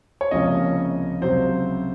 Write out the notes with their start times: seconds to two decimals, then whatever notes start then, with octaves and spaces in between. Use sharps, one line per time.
0.21 C#5
0.31 C#2 C3 F3 A#3 C#4 D#5
1.21 C#2 C3 F#3 C5